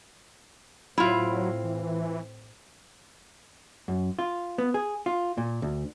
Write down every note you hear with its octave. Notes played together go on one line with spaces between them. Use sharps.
A2 F#3 C4 E4 F4
E3
F#2
F4
B3
G#4
F4
A#2
D2